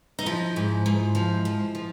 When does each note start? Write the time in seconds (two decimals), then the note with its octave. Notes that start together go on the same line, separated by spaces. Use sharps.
0.19 D#4
0.26 F3 E4
0.56 G#2
0.86 G#2
1.15 F3
1.45 F3
1.75 F3